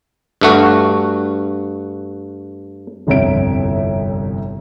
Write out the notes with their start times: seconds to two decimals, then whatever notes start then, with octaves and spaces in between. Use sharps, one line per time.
0.41 G2 A3 F#4
3.07 G1 C2 F2 C#5 E5 D7